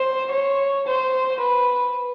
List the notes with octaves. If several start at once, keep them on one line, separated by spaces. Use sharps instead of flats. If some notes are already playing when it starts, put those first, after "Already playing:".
Already playing: C5
C#5
C5
B4